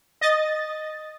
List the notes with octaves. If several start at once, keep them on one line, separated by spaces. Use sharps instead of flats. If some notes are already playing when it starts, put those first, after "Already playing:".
D#5 A6